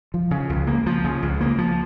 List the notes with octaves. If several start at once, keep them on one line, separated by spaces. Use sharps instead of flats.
F3
C#3
C#2
A#3
F3
C#3
C#2
A#3
F3